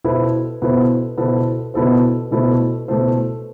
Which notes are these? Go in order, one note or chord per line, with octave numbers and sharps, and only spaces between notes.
B2 B3 E4 A4 C5
B2 B3 E4 A4 C5
B2 B3 E4 A4 C5
B2 B3 E4 A4 C5
B2 A3 E4 A4 C5
B2 A3 E4 A4 C5